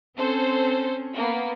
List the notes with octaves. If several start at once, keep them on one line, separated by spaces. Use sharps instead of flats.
C4 C#4 A4 C5
A#3 B3